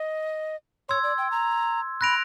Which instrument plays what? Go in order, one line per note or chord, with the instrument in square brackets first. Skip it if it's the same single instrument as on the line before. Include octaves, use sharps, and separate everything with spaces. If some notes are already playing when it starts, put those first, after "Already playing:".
Already playing: [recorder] D#5
[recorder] C#5 [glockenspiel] C6 E6 G#6
[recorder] D5
G5
A#5
[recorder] B5 [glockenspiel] F#6 A#6 D7 F7